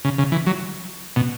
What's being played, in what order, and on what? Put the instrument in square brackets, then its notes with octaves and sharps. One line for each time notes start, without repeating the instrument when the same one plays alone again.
[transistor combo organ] C#3
C#3
E3
F#3
B2